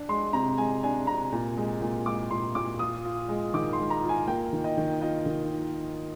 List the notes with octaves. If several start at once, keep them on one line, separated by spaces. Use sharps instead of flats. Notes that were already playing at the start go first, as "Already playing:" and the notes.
Already playing: D4
G#3 C6
C3 A#5
G#3 G#5
D4 G#5
C3 A#5
A#2
G#3
A#2
G#3 D6
A#2 C6
A#2 D6
F4 D#6
F4
G#3
D#3 D6
C6
G#3
A#5
F4
G#5
A#3 G5
D#3
D#5
D#3
F4 D#5
D#3